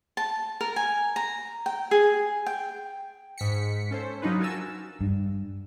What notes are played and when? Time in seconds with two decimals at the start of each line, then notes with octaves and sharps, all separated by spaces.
0.17 A5
0.61 A#4
0.76 G#5
1.16 A#5
1.66 G5
1.91 G#4
2.46 G5
3.38 G#2 B6 C#7
3.91 C#4 A4 C5
4.22 F#3 D4 D#4 F4 B4
4.40 F#4 A#4 G#5 A5 E6
5.01 G2